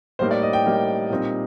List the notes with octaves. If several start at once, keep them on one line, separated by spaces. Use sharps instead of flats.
A2 G3 A#3 D#4 C5
D5
D#5
G5
A2 G3 A#3 D#4
A#2 G3 C4 D#4